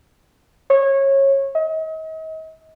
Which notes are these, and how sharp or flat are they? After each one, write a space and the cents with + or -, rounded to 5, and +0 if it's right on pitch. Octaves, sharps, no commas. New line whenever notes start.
C#5 -20
D#5 +40